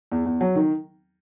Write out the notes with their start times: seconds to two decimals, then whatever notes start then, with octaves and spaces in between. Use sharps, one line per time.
0.12 E2
0.26 E2
0.41 F#3
0.55 D#3